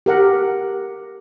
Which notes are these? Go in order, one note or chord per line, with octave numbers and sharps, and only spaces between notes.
G4 A#4 F#5